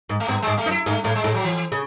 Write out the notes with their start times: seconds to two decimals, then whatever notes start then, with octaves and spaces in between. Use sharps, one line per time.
0.09 G#2
0.20 A3
0.28 G#2 B3
0.42 G#2 G#3
0.58 A3
0.66 F#2 D#4
0.71 E4
0.86 G#2 A3
1.04 A2 A3
1.15 G#3
1.24 A2
1.34 F#3
1.44 E3
1.72 C#3